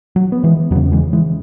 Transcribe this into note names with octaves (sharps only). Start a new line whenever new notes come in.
F#3
B3
E3 G#3
E2 C#3 F#3 B3
E3 G#3
E3 G#3